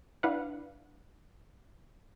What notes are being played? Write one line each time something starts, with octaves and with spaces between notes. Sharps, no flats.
D4 E4 B4 F5 F#5